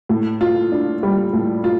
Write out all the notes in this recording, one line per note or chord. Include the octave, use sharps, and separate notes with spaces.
A2
F4
D4
G3
A2
F4